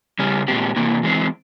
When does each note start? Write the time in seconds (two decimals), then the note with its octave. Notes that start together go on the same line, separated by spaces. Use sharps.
0.19 C#3 G3 C#4
0.48 A#2 G#3 C4 G4
0.76 C3 E3 A#3
1.03 E3 G#3 C4